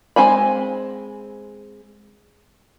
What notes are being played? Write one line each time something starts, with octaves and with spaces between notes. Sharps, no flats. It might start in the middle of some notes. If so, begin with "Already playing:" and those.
G#3 C4 G#5 B5